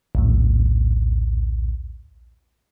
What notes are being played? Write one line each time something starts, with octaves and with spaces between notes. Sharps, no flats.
A#1 D#2 A2